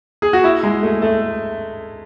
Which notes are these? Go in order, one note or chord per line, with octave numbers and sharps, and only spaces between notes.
G#4
F#4
E4
G#3
A3
A3